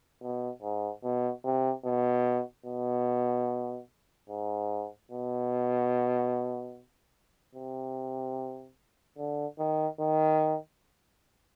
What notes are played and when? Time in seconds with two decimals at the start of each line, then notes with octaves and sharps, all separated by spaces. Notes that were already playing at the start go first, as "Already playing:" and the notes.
0.22 B2
0.62 G#2
1.03 B2
1.44 C3
1.85 B2
2.66 B2
4.29 G#2
5.11 B2
7.55 C3
9.18 D3
9.59 D#3
10.00 D#3